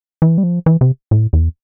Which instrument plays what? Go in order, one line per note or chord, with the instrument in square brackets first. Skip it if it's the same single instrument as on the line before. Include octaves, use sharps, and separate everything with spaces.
[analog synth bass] E3
G3
F3
E3
C3
A2
E2